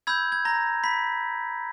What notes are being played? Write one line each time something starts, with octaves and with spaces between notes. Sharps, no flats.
B5 E6 G6 G#6
G#6
A#5 A#6
B5 B6